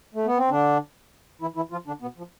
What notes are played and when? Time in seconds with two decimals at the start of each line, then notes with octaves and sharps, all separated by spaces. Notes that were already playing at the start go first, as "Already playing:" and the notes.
0.14 A3
0.26 B3
0.38 C4
0.50 D3 D4
1.42 E3 E4
1.56 E3 E4
1.72 F3 F4
1.87 D3 D4
2.02 B2 B3
2.18 F3